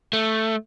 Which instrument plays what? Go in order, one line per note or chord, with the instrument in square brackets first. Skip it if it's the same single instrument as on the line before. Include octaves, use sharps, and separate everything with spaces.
[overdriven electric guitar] A3